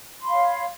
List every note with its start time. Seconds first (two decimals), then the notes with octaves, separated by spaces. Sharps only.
0.21 C6
0.24 B5
0.28 F5
0.32 C#5